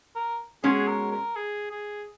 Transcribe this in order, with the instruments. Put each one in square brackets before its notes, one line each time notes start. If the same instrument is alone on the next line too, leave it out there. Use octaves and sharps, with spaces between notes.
[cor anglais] A#4
[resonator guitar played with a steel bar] B2 G#3 C#4 [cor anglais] G#4
[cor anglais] A#4
A#4
G#4
G#4